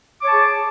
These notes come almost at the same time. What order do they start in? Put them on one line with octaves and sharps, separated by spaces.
D6 C#5 A5 G#4